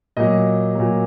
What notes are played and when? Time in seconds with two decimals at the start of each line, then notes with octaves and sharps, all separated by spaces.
0.17 A#2 F#3 D#5
0.75 A#2 F#3